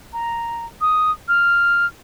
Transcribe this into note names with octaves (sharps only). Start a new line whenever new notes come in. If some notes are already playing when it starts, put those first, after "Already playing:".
A#5
D#6
F6